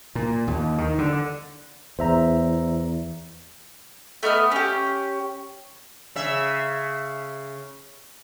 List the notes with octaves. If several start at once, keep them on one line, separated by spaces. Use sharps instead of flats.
A#2
D#2
D#3
D3
E2 C5 E5 A#5
A3 B3 D#5 F6
C#4 G4
C#3 E5